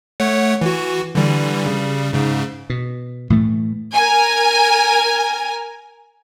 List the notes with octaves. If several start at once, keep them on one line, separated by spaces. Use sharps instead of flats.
A3 C#5 F#5
E3 F#4
D3 E3 G3
C#3 G3
G#2 C#3
B2
A2 E3 A3
A#4 G#5